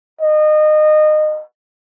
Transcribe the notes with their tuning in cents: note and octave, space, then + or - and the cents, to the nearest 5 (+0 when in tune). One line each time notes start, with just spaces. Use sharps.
D#5 -25